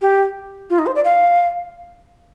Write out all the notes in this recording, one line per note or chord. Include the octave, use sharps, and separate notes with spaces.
G4
F4
D#4
C5
D5
F5